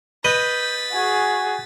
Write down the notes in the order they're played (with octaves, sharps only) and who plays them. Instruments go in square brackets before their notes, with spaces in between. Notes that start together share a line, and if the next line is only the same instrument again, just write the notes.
[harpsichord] B4 D#5 [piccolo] G6 [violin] A6 B6
[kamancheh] F#4 G#4 [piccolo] G#5